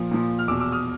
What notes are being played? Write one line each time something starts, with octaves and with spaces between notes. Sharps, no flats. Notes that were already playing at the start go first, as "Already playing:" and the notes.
Already playing: A#2 F3
A#2 F3
F6
E2 B2 D6 E6
D6 E6
D#6 F6